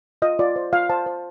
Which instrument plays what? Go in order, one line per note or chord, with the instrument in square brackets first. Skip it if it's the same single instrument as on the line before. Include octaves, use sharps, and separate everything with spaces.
[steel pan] F4 D#5
F4 D5
C5
F4 F5
C5 A5
C5